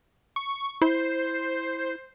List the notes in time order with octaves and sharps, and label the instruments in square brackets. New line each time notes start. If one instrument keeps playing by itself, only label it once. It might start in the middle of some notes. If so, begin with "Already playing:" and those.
[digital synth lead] C#6
[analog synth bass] E4 [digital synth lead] C5